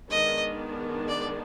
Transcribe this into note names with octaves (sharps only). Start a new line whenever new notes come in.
D#3 G#3 B3 D4 D#5
D5